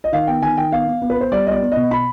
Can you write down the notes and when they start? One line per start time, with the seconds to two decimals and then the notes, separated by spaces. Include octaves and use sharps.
0.04 D#5
0.12 D#3 F5
0.27 B3 G5
0.42 D#3 G#5
0.57 D#3 G5
0.72 B3 F5
0.87 B3
1.02 B3
1.10 B4
1.17 B3 C5
1.32 G3 D5
1.46 B3 D5 D#5
1.62 B3
1.72 B2 D#5
1.91 B2 B5